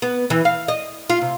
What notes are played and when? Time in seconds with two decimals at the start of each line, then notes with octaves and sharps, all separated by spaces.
0.02 B3
0.30 E3
0.45 F5
0.68 D#5
1.09 F4
1.21 C3